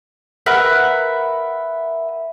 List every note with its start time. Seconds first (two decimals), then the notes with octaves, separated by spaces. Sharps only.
0.46 A#4 B4 E5 F#5